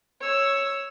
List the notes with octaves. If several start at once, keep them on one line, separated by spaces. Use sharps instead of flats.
C#5 E6